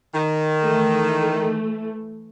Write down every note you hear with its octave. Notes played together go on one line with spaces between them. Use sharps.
D#3
E3 A3